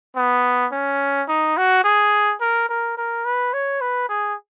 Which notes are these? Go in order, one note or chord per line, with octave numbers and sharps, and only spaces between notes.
B3
C#4
D#4
F#4
G#4
A#4
A#4
A#4
B4
C#5
B4
G#4